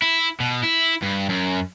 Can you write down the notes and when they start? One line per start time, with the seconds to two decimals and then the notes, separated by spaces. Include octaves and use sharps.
0.02 E4
0.40 B2
0.63 E4
1.03 G2
1.29 F#2